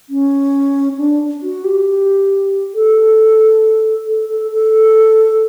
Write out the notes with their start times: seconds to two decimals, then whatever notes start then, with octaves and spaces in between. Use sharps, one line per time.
0.09 C#4
0.98 D4
1.42 F#4
1.64 G4
2.74 A4
4.07 A4
4.29 A4
4.51 A4